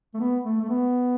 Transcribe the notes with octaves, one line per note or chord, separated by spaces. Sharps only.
A3
B3
A3
A3
B3